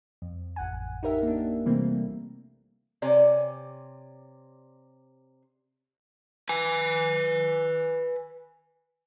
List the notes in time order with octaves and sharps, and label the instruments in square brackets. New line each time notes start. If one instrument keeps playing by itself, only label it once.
[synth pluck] F2
A1 F#5 G#5
D#4 G4 A#4 E5
A#3 D4
C3 E3 G3 A3 A#3 C4
[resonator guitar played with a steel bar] C3 C#5 D5 G#5
[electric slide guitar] B4 G#5